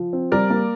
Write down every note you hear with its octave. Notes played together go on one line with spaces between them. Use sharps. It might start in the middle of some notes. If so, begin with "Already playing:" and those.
Already playing: F3
C4
G3 A#4 D5
A#3